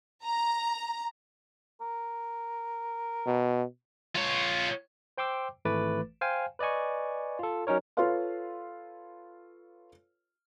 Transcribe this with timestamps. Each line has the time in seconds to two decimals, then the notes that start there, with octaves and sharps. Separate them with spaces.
0.24 A#5
1.81 A#4
3.26 B2
4.15 F4 C#5
5.18 C5 G5 C6 D6 E6
5.65 G#1 E3 A3 B4 D6 A6
6.21 C5 F5 G5 G#5
6.59 B4 D5 D#5 G#5 C#6
7.39 F4 A4
7.67 F#3 C#4 D#4 A#4 C#5
7.97 F4 A4 B4 C#5 F5 C6